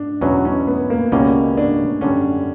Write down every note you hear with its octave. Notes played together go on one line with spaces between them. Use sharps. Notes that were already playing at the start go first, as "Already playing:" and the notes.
Already playing: D4
E2 B2 F#3 C#4
C#4
B3
A#3
C#2 B2 G3 A#3 C#4
D4
F#2 D3 G3 C#4